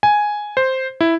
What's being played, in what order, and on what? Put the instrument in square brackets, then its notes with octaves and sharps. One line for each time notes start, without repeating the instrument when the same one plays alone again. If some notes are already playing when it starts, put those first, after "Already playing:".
[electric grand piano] G#5
C5
E4